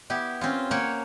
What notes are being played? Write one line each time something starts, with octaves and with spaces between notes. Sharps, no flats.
B3 E4 G4
C4 C#4 F4
A#3 C#5 F#5 G5